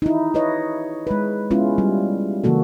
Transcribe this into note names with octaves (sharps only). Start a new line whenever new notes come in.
D#4 E4
E4 B4 C#5 D#5
G#3 B4
G#3 B3 C#4 E4 F4
G3
C#3 E3 A#3 F#4 A4